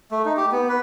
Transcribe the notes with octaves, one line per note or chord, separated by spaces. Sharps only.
A3
D#4
G4
B3
B4